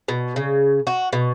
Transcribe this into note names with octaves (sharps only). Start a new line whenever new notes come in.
B2
C#3
F#4
B2